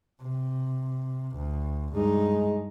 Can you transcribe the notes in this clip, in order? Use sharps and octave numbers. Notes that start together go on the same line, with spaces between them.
C3
D2
G2 G#3 D#4